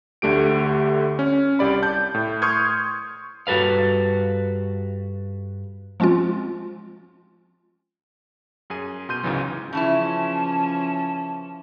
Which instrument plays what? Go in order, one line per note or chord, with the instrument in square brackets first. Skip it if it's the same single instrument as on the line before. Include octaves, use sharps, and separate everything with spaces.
[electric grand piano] D2 D3 A3 G4 D7
C#4
C2 G4 D5 B5
A5 G6
A2
C6 C#6 D#6 F6 G6 G#6
[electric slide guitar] G2 F#4 A4 B4 F5
[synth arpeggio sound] F3 G#3 C4 C#4 F4
[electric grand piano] F#2 G#4 G#5 D#7
B2 C6 G6 D#7
C#2 G#2 C#3 E3 F#3
[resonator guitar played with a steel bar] C#3 E3 E4 [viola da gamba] F3 C#4 [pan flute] A5